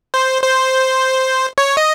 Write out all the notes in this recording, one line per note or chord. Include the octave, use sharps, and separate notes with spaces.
C5
C5
C#5
D#5